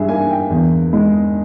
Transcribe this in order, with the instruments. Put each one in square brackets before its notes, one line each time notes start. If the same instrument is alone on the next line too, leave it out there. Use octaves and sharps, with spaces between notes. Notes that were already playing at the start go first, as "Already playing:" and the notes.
Already playing: [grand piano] G2 G3 G#4 E5
A#3 G#5
G5
E2
G#3